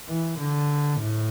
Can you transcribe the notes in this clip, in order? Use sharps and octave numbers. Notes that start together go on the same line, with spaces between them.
E3
D3
A2